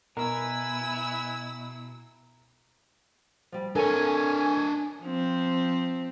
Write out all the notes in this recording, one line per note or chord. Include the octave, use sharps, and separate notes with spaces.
B2 E4 A#4 B4 G#5 E6
F3 G3
D4 A4 A#4 C#5 F5 G#5
F3 C4